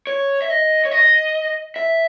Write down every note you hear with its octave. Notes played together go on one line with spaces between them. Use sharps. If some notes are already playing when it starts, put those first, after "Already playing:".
C#5
E5
D#5
C#5
D#5
E5